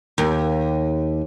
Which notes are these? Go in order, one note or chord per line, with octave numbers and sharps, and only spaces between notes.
D#2